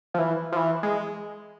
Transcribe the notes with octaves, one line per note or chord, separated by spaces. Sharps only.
F3
E3
F3
E3
G#3